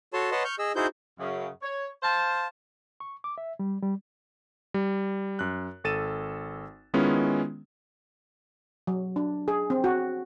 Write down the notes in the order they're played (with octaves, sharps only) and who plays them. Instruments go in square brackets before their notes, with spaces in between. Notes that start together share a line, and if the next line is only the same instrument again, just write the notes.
[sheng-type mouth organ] F#4 A4 C#5 A5 C6
B4 C#5 D#5 F#5 A5 C6
C#6 F6 G6
G#4 D#5 E6
D#4 E4 F#4 G#4 C5 G6
[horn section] F#2 C#3
C#5
C5 F5 A5
[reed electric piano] C#6
D6
E5
G3
G3
[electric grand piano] G3
F#2 F#6
G#1 A4 A6 D#7 E7
D#3 G#3 B3 C#4 E4 F4
[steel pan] F#3
D4
G#4
C4
F#4